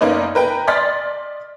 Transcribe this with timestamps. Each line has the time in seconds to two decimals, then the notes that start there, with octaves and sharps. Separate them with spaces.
0.01 F#1 A#3 C#4 D#4 B4 D5
0.35 A#4 B4 G5
0.67 D5 D#5 C6 F6 A6 B6